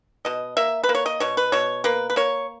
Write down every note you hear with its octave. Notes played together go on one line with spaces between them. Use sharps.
B2 D#5
A#3 E5
B4
A#3
C#5
D#5
B2 C#5
B4
B2 C#5
A#3 B4
B4
A#3 C#5